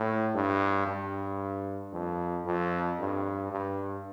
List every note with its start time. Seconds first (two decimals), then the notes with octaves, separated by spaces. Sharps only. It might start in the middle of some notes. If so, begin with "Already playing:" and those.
Already playing: A2
0.35 G2
0.87 G2
1.93 F2
2.46 F2
3.00 G2
3.52 G2